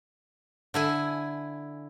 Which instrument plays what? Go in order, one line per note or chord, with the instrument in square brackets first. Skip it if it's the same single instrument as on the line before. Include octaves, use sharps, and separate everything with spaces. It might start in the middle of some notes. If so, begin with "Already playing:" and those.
[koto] D3 E4 G#5